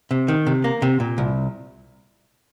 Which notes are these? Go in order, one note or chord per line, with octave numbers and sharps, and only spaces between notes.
C3
D#3
C3
A#3
C3
A#2
C2